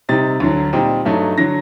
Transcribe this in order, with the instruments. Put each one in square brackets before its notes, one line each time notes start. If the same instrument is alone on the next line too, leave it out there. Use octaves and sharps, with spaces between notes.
[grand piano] C3 G3 C4 D#4 A6
D2 D3 F#3
A#2 G3 C4 D#4
G2 F#3 A3 D#4
D3 F#3 A#6